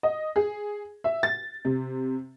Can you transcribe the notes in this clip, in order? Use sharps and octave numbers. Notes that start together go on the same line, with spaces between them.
D#5
G#4
E5
A6
C3